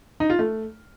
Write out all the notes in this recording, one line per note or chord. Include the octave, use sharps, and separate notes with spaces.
D#4
F4
A3